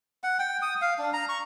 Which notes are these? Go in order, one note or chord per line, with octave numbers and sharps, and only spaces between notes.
F#5
G5
D#6
F5
D4
A#5
C#6